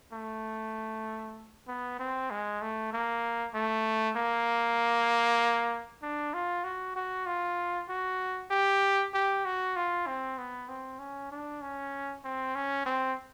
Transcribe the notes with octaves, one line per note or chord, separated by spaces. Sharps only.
A3
B3
C4
G#3
A3
A#3
A3
A#3
D4
F4
F#4
F#4
F4
F#4
G4
G4
F#4
F4
C4
B3
C4
C#4
D4
C#4
C4
C#4
C4